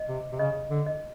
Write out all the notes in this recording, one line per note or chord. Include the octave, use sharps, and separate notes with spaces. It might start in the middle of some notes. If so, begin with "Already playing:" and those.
Already playing: D#5
C3
C3
C#3 D#5
D3
D#5